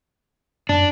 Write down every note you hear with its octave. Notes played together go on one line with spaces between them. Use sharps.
F#2 D4